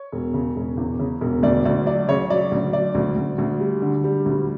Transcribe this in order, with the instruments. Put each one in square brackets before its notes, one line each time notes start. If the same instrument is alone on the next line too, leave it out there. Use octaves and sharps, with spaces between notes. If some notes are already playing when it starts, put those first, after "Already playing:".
Already playing: [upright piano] C#5
E1
C#3
E1
E2
C#3
E1
D2 D5
D2 D5
F#3 D5
C#3 C#5
F#3 D5
D2
F#3 D5
D2
D2
D2
G3
D3
G3
D2